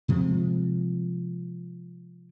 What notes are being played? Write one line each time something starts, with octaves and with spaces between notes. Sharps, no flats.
C3 F3 G#3 C4